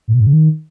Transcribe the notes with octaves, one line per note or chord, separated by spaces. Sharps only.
A2
B2
G#2
C#3
D#3